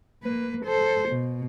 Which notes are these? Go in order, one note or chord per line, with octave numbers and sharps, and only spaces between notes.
A#3 B4
A4 C5
B2